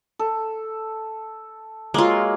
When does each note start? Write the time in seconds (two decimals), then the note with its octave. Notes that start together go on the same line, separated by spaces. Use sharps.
0.19 A4
1.94 F#3 G#3 A#3 F4